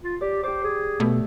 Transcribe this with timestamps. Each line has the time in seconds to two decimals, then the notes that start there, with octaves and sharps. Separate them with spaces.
0.04 F4
0.21 G4 D5
0.43 G4 C5 D6
0.64 G#4
1.00 B2 A3